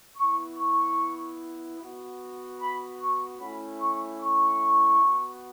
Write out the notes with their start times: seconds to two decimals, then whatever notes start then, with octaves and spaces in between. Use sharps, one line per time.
0.16 B3 E4 C#6
0.56 C#6
1.77 B3 F#4
2.58 B5
2.98 C#6
3.38 A3 C#4 E4 B5
3.79 C#6
4.20 C#6
4.99 B3 F#4